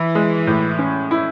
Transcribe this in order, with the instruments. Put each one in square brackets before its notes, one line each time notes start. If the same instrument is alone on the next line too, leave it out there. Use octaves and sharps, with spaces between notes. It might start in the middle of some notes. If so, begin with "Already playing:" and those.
Already playing: [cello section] E3 [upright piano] E4
[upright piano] G#3
A2
C#4
E4